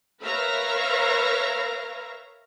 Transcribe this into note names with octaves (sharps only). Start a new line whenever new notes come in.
A#4 B4 C#5 E5 F5 A#5